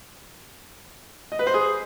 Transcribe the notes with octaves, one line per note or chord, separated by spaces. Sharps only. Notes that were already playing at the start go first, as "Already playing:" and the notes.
D#5
B4
C5
G#4